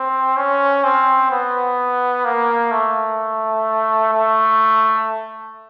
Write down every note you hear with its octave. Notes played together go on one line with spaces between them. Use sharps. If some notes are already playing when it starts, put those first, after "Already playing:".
Already playing: C4
C#4
C4
B3
A#3
A3
A3